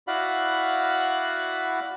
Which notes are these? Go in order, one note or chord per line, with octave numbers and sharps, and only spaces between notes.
E4 F#4 D5 F5 F#5 B5